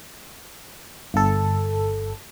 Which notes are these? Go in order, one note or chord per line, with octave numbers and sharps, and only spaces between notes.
G1 A4